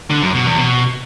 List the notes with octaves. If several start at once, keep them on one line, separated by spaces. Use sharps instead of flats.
D3
F#2
B2
E2
B2